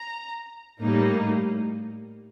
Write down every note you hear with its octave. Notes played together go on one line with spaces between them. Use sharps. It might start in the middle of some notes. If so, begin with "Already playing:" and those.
Already playing: A#5
A2 G3 A#3 D#4